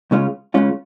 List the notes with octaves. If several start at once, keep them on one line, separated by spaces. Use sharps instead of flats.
C#2 C#3 G#3 C#4 F4
C#2 C#3 G#3 C#4 F4